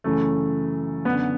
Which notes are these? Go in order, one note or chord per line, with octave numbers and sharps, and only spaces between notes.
F#2 C#3 E3 A3
F#2 D3 B3